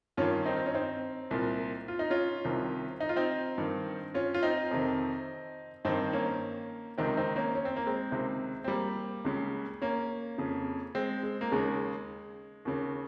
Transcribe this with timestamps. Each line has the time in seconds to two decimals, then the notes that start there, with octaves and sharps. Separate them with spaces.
0.17 G2 D#3 C#4 F4
0.46 C4 D#4
0.56 C4
0.66 C#4
0.75 C4 D#4
1.31 C2 A#2
1.88 F4
1.99 D#4
2.10 C#4 F4
2.45 C2 C3 D#3
3.01 D#4
3.09 F4
3.16 C4 D#4
3.58 G2 D#3
4.14 C#4 F4
4.34 F4
4.43 C4 D#4
4.71 F2 C3 D#3
5.85 G2 D#3 C4 D#4
6.13 A#3 C#4
6.98 C#2 C3 D#3 C4 D#4
7.17 C4 D#4
7.36 A#3 C#4
7.55 C#4
7.65 C4
7.76 A#3
7.87 G#3 C4
8.12 C#2 C3 D#3
8.64 C4
8.68 G3 A#3
9.25 C#2 C#3
9.82 A#3 C#4
10.38 F2 C#3
10.95 G#3 C4
11.23 G#3
11.41 A#3
11.52 D#2 C#3 G#3
12.65 D#2 C#3